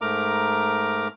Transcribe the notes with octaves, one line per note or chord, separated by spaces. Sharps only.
G#2 A3 A#4 A#5 D6